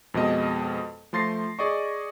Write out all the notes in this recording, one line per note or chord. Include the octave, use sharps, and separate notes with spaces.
F2 B2 G#3 D#5
F3 A3 C6 A6 A#6 C7
G#4 D5 D#5 C#6